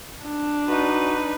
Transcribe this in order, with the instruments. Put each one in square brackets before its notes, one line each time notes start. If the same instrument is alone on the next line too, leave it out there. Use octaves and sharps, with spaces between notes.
[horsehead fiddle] D4
[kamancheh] D#4 B4 [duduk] F#4